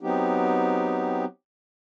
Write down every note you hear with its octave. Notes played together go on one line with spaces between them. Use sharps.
F#3 B3 C4 D#4 G4